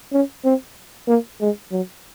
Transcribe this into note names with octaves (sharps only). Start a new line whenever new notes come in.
C#4
C4
A#3
G#3
F#3